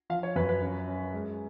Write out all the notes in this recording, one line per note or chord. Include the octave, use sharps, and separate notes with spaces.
F3 F5
C#5
F#2 B4
B4
C#4
C#4
G#3